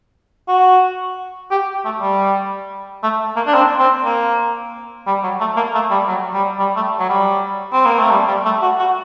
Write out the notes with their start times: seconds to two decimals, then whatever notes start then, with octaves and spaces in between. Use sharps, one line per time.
0.48 F#4
1.51 G4
1.85 A3
2.01 G3
3.03 A3
3.36 A#3
3.47 D4
3.54 C4
3.79 C4
4.05 A#3
5.07 G3
5.23 F#3
5.40 A3
5.56 A#3
5.74 A3
5.91 G3
6.07 F#3
6.34 G3
6.59 G3
6.76 A3
6.99 F#3
7.09 G3
7.73 C4
7.85 A#3
7.99 A3
8.11 G3
8.28 G3
8.45 A3
8.62 F#4
8.79 F#4